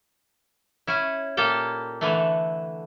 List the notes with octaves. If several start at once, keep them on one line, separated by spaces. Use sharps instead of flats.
C#4 E4
A#2 A#3 G4 A4 G5
D3 E3 A3